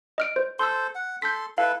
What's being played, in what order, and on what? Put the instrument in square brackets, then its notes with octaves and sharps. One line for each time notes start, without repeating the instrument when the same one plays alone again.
[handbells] D#5 F6 D7
C5
[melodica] A4 C5 [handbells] C6 E6
[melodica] F#5
[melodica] A4 C6 [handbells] G6 B6
[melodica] E4 A4 B4 [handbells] F5